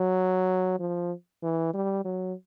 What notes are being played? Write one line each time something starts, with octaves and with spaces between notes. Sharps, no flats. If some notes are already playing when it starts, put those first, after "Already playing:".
Already playing: F#3
F3
E3
G3
F#3